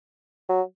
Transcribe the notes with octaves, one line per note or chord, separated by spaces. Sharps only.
F#3